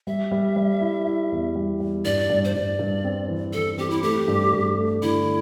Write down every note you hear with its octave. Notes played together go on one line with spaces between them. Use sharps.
G3 E5
G3
G3
E4
E4
E2
G3
G3
G2 D5
G2
C5
G2 D5
G2
C4
E3
E3 A4
C4 G4
E4
A3 G4
G2
G2
A3
D3 E4